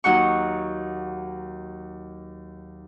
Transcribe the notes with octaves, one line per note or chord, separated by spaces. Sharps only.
D#2 F#3 D#4 F#5 C#6